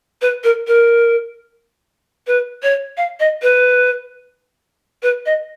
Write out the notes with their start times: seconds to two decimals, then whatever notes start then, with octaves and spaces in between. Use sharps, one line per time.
0.22 B4
0.44 A#4
0.67 A#4
2.27 B4
2.63 C#5
2.97 F5
3.20 D#5
3.42 B4
5.03 B4
5.26 D#5